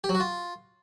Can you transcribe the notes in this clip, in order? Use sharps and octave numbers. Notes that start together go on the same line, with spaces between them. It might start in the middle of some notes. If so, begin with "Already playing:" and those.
G4
F#3
F#4
F4